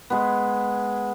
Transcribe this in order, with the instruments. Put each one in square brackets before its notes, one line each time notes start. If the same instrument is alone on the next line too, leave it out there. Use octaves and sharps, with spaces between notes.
[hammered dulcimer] G#3 B3